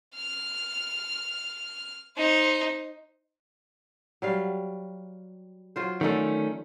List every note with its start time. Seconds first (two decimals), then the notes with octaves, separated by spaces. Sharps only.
0.16 F6
2.17 D#4 C5
4.22 F#3 G3 F5
5.76 F#3 F4 C5
6.01 D3 D#3 A3 C#4 D#4 A4